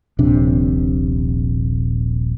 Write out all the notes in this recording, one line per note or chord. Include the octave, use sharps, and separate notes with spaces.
D#1 A#1 C3 D4